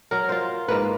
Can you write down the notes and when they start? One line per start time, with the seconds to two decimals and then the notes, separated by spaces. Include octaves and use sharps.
0.11 F#3 A#4
0.29 F4 C5
0.68 G#2 A#3 B4